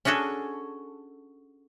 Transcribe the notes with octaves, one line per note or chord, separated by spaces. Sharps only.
C#4 D4 F#4 G#4 A4